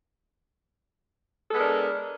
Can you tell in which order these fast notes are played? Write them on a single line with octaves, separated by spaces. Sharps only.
A4 G#3 B3 D4 A#4